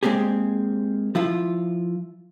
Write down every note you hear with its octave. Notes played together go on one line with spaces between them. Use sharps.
G#3 A#3 C4 G4 G#4
F3 E4 F4